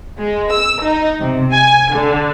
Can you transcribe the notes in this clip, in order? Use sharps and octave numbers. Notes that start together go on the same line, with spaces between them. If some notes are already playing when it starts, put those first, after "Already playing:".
G#3
E6
D#4
C3
G#5
D3